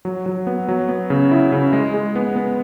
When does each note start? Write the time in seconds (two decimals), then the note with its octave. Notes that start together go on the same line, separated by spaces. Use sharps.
0.05 F#3
0.26 F#3
0.47 B3
0.68 F#3
0.88 B3
1.10 C#3
1.31 E4
1.52 C#3
1.73 G#3
1.94 G#3
2.15 B3
2.36 B3